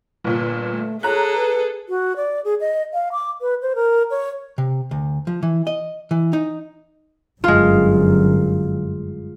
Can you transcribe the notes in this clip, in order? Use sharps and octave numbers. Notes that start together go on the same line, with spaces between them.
G1 A#2
A3
G#4 A4 C#5 A#5 F#6
B4
F#4
D5
G#4
D#5
F5
D6
B4
C5
A#4
C#5
C3
D2
F3
E3
D#5
E3
D#4
G1 F#2 G#3 F4